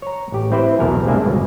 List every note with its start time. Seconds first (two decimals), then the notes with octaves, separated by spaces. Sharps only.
0.02 C#5 A#5
0.32 A1 G4
0.52 C4 E4 G4 B4 C5
0.79 B1 E2 B2 A#4 F#5 G#5
1.06 C3 G#3 A#3 D4 E5 G#5
1.25 G1 C#2 B2